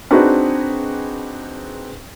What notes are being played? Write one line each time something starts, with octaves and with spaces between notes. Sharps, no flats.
C4 D4 D#4 F#4 G#4 B4